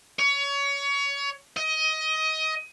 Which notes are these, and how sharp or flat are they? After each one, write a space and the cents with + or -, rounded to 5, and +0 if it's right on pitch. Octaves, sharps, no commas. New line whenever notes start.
C#5 +25
D#5 +20